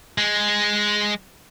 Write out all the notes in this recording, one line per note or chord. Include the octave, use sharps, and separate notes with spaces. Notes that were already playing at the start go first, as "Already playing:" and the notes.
G#3